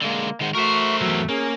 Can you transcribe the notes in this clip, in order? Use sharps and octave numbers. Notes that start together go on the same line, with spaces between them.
D3 G#3 A#3
D#3 G#3 C5 F#5
A3 F#4 A#4 C5 E5 C#6
E2 F#3 E6
A#3 C#4 G#4